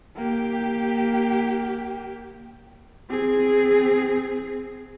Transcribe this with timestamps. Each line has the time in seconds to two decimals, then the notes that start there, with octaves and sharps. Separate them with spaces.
0.16 A#3 G4
3.10 C4 G#4